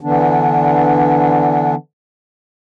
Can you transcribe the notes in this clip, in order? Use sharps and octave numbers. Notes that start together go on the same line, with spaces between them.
D3 E3 B3 D4